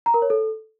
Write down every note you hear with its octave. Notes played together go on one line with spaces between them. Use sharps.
A#5
A#4
C#5
A4